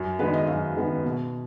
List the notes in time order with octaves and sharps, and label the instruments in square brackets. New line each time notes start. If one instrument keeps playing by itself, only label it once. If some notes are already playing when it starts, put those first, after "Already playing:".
Already playing: [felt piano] F#2
D#3 G#3 B3 B4
D#5
F#2 F5
D#3 G#3 B3
B2